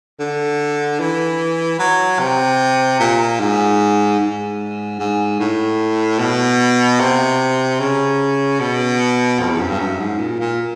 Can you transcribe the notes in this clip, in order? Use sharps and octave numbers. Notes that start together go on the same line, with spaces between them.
D3
E3
F#3
C3
A#2
G#2
G#2
G#2
A2
B2
C3
C#3
B2
F2
E2
F#2
G2
F#2
G#2
A#2
A#2